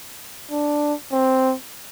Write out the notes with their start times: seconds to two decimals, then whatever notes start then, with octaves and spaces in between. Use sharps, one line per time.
0.51 D4
1.12 C4